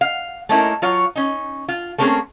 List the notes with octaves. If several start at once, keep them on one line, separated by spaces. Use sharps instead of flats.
F5
A3 A#3 C#4 D#4 E4 A#4
F#3 F4 C#5
C#4 D#4
F4
A3 A#3 C4 C#4 G#4